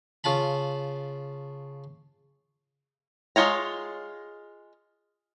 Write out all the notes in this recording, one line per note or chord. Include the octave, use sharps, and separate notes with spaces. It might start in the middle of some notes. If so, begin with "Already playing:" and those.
C#3 F4 A5 B5
G#3 D#4 F4 C#5 A#5